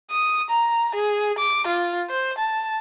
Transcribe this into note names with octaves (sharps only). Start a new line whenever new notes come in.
D#6
A#5
G#4
D6
F4
C5
A5